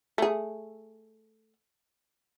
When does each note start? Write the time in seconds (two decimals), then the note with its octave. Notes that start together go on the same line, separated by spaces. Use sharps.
0.18 A3 G#4